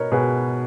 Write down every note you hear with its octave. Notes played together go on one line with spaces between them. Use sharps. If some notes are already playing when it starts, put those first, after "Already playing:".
Already playing: B2 A#4 B4 C#5 D#5
B2 G#4 B4